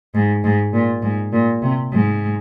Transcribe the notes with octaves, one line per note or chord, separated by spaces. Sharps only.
G#2
G#2
A#2
G#2
A#2
C3
G#2